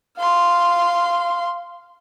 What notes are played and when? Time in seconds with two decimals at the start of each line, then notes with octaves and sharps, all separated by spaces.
0.18 F5 C6